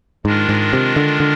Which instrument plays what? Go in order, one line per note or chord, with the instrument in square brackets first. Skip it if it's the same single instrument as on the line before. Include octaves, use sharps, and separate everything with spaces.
[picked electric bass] G#2 [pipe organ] D#3 G#3 D4 F4 A#4
[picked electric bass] G#2
C3
D3
D3